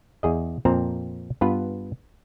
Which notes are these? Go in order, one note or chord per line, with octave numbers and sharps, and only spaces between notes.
E2 G#4 D#5
F2 A#2 C4 C5 A#5
G2 B3 F4 B4